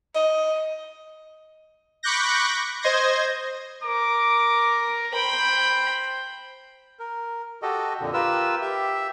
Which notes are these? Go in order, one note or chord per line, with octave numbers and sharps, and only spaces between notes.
D#5
B5 C#6 D6 F#6 G6 A#6
C5 D#5 C6 G#6 A#6
A#4 D6
C5 G5 B5
A#4
F#4 G4 A4 D#5
F2 A#2 D3
F4 G4 A#4 B4 E6
G4 E5